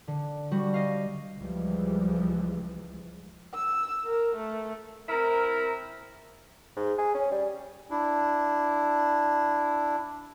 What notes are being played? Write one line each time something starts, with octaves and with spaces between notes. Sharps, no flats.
D3
G3 F#4
D#5 F5
C#2 E3 F3 G3 G#3
E6
A#4
A3
C4 E4 A#4
G#2
G#4
C#4
G3
D4 E4